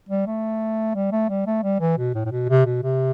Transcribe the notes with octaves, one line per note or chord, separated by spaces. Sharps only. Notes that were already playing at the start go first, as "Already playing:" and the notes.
G3
A3
G3
A3
G3
A3
G3
E3
B2
A2
A2
B2
C3
B2
C3